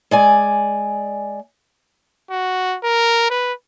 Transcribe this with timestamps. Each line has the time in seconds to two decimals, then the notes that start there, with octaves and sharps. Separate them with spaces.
0.11 G#3 D5 G#5
2.31 F#4
2.84 A#4
3.30 B4